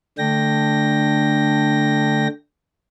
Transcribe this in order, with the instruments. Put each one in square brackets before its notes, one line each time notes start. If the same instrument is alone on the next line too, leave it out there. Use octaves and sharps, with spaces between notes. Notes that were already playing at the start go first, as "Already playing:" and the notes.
[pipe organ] D3 A3 D4 G5 A#6